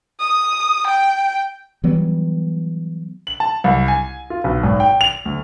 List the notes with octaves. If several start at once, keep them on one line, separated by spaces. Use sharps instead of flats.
D#6
G5
E3 F#3 G3 B3
F#7
A5
C2
G#5
F4
B1
G#1
G5
F7
D2